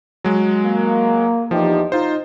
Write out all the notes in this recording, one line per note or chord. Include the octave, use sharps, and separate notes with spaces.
F#3 G#3
A#3
E2 F3 D#4 G4
D#4 F4 C5